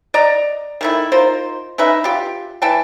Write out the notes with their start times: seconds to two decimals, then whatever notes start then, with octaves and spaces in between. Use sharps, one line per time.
0.14 D5 D#5 A#5
0.81 D#3 A3 E4
1.12 D#4 F4 A#4 C5
1.78 C#4 D#4 B4 E5
2.04 F4 G4
2.62 E3 G5 A5